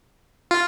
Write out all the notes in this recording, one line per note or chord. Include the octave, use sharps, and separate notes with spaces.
F4